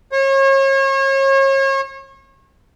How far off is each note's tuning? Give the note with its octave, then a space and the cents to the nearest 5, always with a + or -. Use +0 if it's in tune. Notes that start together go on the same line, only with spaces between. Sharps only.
C#5 -35